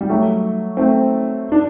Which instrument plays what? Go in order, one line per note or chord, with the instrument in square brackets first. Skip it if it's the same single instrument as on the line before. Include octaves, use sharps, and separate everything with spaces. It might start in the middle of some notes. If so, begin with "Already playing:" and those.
[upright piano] G3
F#3 A3
A3 C4
D4